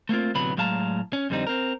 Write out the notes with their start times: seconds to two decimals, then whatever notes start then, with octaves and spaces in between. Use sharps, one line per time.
0.09 A3 A#3 C4 F4
0.34 D2 A2 C3 F#3 B3 B5
0.57 A2 F#3 G#3 F5 A5 A#5
1.13 C#4
1.30 F2 D3 G3 C4 D#4
1.47 C4 A#4